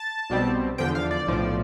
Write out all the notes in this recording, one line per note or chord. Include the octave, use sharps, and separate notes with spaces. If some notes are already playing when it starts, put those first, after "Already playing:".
Already playing: A5
B1 B2 G3 C4
E2 D3 F3 G5
F5
D5
B1 A2 F3